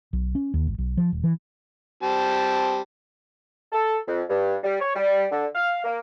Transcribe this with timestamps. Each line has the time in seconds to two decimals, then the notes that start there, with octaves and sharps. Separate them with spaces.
0.13 B1
0.35 C#4
0.54 D#2
0.67 G#1
0.78 B1
0.97 F3
1.12 D#1
1.24 E3
2.03 G3 C4 A5
3.72 A4
4.07 F2
4.29 G2
4.64 G3
4.80 C#5
4.95 G3
5.31 D3
5.55 F5
5.84 A#3